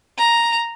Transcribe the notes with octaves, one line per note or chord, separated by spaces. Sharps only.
A#5